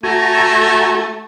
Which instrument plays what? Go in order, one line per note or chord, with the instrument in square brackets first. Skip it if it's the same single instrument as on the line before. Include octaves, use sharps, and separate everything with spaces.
[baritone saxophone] A3 [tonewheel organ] F#4 G#5 A#5